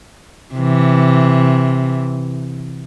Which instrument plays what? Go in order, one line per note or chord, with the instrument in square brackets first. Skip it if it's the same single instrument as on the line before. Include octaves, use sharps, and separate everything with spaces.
[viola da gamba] C3 E3